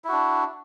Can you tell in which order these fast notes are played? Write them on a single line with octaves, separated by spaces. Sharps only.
E4 F#4 D4